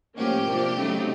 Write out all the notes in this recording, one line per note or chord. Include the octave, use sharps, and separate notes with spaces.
A2 F3 A#3 C#4 G4
C3 F3 A#3 D4
C#3 F#3 A3 C4 D#4